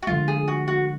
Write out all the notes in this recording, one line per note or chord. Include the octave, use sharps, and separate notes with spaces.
F#4
D3 F3 G#3 F4
G#4
F#4
F#4